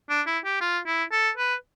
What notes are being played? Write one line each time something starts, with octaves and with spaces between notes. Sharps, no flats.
D4
E4
G4
F4
E4
A4
B4